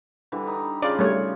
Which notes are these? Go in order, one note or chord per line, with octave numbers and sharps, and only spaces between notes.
D3 E3 G3
D#4
C#3 F4 D5
G3 A3 C#5